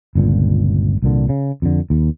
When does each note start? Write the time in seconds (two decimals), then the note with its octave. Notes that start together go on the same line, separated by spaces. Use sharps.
0.15 G1 C#2 A#2
1.02 C2 A#2 D3
1.29 C#3
1.62 F2 D3
1.90 D#2